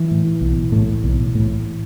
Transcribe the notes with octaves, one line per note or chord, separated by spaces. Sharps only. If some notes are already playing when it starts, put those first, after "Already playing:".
Already playing: E3
A2
B1
A2
B1
A2